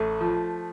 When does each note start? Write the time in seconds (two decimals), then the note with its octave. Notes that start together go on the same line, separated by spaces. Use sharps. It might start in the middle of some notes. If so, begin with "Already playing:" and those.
Already playing: A1 A3
0.21 F3